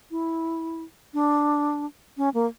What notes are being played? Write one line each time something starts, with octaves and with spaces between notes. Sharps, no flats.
E4
D4
C#4
A#3